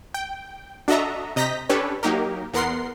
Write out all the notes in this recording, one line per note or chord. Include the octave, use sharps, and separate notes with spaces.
G5
D4 F#4 A4 D#5 E5 A#5
C3 D#5 A#5 G6 A#6 B6
C#4 D4 G4 A4 B4 C#5
F#3 A#3 D#4 G4 A#4
E2 B3 A#4 F#5 C6 C7